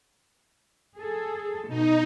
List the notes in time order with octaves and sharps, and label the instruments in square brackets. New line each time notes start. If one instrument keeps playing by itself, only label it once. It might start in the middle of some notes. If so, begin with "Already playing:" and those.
[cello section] G#4 A4
[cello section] B2 [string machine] D#4